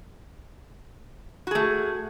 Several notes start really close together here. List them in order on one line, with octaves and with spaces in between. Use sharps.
F#4 G#4 A3